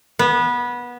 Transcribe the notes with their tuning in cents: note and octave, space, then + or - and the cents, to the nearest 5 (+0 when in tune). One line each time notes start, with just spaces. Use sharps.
B3 -20